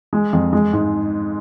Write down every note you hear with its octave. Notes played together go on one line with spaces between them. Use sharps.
G#3
F2
G#3
G#2